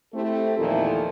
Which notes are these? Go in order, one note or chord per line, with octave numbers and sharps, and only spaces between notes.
A3 C4 E4 G4 A4
E2 A#2 D#3 F3 A3 E4